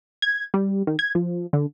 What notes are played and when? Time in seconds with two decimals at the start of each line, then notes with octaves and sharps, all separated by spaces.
0.22 G#6
0.54 G3
0.87 D#3
0.99 G#6
1.15 F3
1.53 D3